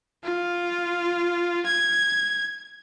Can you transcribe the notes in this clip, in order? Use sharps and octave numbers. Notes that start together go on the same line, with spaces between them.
F4
G#6